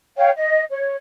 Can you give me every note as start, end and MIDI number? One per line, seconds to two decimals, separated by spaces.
0.17 0.30 73
0.17 0.30 77
0.17 0.30 79
0.36 0.62 75
0.71 0.94 73